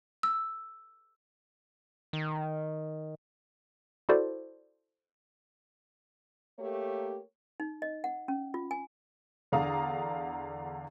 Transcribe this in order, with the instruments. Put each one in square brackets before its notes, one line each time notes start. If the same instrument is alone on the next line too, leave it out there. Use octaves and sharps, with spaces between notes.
[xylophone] E6
[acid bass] D#3
[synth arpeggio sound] E4 F#4 A4 C5 D5
[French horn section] A3 A#3 G4 A#4 C#5
[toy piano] D#4
D#5
F#5
C#4
F4
G#5
[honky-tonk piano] E2 D3 D5 F5 A#5 D#6